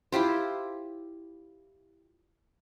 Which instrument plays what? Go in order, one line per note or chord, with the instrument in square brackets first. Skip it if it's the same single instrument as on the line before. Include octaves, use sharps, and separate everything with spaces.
[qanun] E4 F4 G4 C5